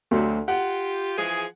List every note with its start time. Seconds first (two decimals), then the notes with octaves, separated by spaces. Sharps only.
0.11 D2 C3 F#3
0.48 F4 G4 F#5
1.18 E3 F3 G#4